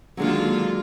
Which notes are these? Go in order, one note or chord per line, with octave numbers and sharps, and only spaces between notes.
D3 D#3 F#3 G#3 A#3 F4